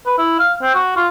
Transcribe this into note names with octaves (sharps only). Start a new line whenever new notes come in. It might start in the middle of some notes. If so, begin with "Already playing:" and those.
B4
E4
F5
C4
F#4
F4